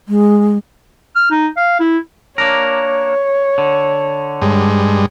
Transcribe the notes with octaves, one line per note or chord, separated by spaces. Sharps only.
G#3
F6
D#4
F5
E4
A#3 D4 A#4 C#5
D3
G2 G#3